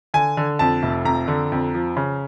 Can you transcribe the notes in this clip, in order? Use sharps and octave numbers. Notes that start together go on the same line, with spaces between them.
D3 G#5
D3
F2 A5
F1
F2 A#5
D3
F2
F3
C#3